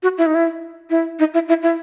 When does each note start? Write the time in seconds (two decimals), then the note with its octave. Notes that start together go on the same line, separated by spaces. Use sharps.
0.03 F#4
0.18 E4
0.26 D#4
0.35 E4
0.90 E4
1.19 D#4
1.34 E4
1.49 E4
1.63 E4